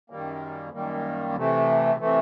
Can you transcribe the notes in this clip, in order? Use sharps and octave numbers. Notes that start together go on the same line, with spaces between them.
F#2 D#3 G3 A#3
F#2 D#3 G3 A#3
C3 E3 A3
C3 E3 A3